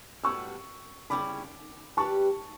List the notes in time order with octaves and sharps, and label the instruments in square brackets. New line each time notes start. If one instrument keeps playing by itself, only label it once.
[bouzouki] A2 G3 B3 F#4 [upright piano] C#6 E6
[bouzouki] C#3 G3 C#4 E4 [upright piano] B5 D6
[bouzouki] G3 D4 G4 B4 [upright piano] A5 C#6